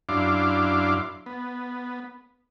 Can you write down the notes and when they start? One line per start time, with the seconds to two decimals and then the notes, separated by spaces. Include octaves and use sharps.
0.09 F#2 D4 E4 F5 C6 D6
1.26 B3